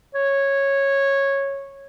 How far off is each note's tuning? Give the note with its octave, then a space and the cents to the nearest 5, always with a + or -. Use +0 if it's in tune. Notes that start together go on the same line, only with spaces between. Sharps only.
C#5 -10